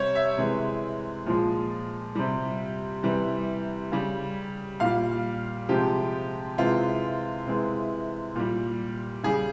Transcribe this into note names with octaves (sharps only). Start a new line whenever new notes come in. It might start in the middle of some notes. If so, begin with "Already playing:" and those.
Already playing: C3 G3 C5 C#5
E5
C3 E3 G#3
A#2 F3 G#3
C3 G3
C3 E3 G3
C#3 G3
A#2 G3 F5
C3 F3 G#3 G4
C3 E3 G#3 F4
C3 E3 G#3
A#2 G3
C#3 G3 G#4